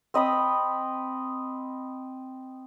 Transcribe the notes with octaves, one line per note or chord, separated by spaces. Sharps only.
C4 D#5 B5 D#6